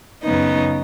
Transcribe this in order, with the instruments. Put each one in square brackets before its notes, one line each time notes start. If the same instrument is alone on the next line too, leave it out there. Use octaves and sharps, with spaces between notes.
[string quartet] F#2 C#3 B3 D#4